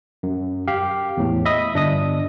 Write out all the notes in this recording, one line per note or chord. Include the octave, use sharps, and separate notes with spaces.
F#2
G4 F5
E2 A2
D#5 E5 B5 D#6
G1 D4 D#5 D#6